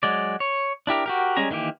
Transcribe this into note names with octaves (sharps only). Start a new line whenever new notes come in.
F#3 G#3 D5
C#5
D4 E4 G4 A#4
F#4 G4 A#4
G3 G#3 C#4 G#4 A#5
D#3 E3 A#3 G4